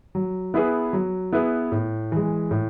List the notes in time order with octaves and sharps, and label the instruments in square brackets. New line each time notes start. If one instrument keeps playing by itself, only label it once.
[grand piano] F#3
B3 E4 G#4 B4
F#3
B3 E4 G#4 B4
A2
E3 G#3
A2